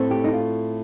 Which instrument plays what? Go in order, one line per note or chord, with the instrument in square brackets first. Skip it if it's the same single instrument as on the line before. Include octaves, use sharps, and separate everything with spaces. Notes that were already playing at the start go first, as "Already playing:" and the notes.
Already playing: [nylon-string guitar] A2 A3 C4
G4
D#4
F4